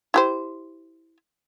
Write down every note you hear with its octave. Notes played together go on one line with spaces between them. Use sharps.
E4 G4 C5